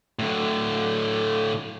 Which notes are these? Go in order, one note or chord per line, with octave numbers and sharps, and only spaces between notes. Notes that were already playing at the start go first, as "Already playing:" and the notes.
A2 D3